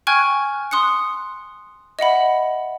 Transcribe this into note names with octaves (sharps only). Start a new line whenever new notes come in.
G5 G#5 C#6 F6 F#6 G#6
C6 D#6 F#6 C#7
D#5 E5 F#5 B5